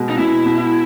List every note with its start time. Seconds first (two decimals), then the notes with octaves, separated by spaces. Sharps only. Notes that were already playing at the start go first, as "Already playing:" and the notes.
Already playing: B2 G#3
0.10 D#4
0.18 B2 E4
0.46 B2